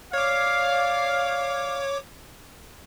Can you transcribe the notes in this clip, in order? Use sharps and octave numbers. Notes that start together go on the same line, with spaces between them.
C#5 D5 F5 D6